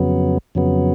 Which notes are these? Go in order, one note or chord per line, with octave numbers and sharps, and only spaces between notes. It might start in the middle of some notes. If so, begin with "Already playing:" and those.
Already playing: F2 C#3 F#3 B3
F2 C#3 F#3 B3